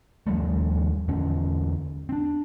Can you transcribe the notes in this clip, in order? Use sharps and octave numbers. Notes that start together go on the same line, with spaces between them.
D#2 F3 G3 A3
E2 D3 C#4
C4 D4